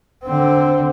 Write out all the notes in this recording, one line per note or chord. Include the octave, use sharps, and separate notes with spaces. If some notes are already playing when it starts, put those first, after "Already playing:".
D3 C4